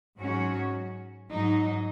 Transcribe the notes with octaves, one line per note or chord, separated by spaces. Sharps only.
G#2 F#3 C#4 F#4 C#5
G#2 F#3 D#4